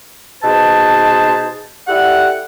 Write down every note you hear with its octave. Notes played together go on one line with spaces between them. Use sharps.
B2 D#4 G#4 B4 C5 A5
E4 G4 A4 D5 F#5